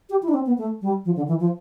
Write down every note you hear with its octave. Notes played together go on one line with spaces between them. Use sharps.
G4
E4
D4
C4
B3
A3
G3
F3
D3
E3
F3